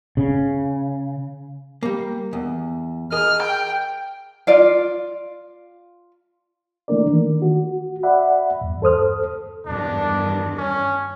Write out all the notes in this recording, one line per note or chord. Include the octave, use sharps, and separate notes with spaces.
C#3
G3 A#3
E2
G#4 A#4 D#5 F6
G5
F4 D5 F5
E3 A3 A#3 D4 A#4 D5
D#3
F#4
D5 E5 F#5 B5
E2 G2
A4 C5 D#6 F6
E2 G2 D#3 D4
C#4